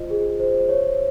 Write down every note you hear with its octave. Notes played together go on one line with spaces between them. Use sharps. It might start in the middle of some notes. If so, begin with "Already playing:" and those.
Already playing: F4 C5 D#5
G#4
C5
C#5